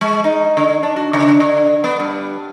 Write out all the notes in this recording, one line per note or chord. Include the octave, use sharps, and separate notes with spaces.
G#3
D#4
D3
D4
F#4
C#3
D3
B3
G2